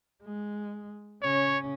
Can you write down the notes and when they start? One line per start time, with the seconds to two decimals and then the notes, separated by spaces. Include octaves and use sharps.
0.23 G#3
1.22 C#3 C#4 C#5